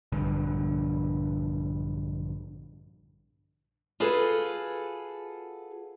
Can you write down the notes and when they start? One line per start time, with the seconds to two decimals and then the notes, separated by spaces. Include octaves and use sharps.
0.12 A#1 G2 D3
4.00 F4 F#4 G#4 A4 B4